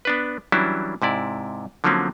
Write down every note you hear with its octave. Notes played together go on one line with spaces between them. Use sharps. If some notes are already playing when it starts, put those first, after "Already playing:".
B3 D4 B4
E3 F#3 G3 C#4 D4 E4
G#2 C3 E4 D5
D3 F3 F#3 A#3 C4 C#4